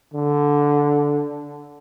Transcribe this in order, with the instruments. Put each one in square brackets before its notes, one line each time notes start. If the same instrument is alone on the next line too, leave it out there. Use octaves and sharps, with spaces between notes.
[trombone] D3